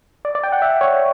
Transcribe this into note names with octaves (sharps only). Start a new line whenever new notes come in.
D5
D5
G5
F#5
E5
C#5